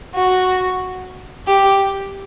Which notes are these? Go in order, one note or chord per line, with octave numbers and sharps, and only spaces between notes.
F#4
G4